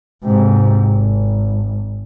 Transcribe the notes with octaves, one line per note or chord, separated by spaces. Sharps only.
G#2 C3
G#1